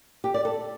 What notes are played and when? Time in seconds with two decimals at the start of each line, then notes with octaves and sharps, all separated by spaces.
0.24 G4
0.34 D5
0.45 A4